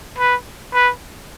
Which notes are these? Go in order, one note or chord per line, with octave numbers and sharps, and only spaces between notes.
B4
B4